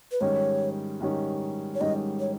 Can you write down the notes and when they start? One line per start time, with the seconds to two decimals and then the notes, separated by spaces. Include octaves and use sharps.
0.12 B4
0.21 G#2 D#3 G3 C#4 C#5
1.01 G#2 D#3 G3 C#4
1.75 C#5
1.80 G#2 D#3 G3 C#4 D#5
2.20 C#5